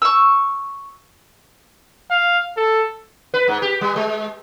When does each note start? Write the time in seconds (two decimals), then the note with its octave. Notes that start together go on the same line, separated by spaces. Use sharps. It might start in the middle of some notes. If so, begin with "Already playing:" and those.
0.02 C#6 E6
2.10 F5
2.57 A4
3.34 B4
3.48 G#2
3.62 G4
3.81 G3
3.96 G#3